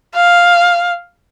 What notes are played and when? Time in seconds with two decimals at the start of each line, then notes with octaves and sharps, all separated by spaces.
0.15 F5